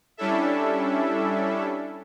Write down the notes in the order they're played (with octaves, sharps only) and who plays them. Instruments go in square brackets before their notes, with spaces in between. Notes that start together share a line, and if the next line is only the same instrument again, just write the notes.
[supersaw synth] G3 C#4 D4 E4 A4 E5